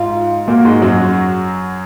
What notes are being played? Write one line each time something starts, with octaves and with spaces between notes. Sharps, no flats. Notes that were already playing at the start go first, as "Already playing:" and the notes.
Already playing: G#2 F4
A#2 A#3 F#4
G#2 G#3
F#2 F#3